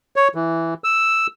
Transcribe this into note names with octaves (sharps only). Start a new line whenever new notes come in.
C#5
E3
E6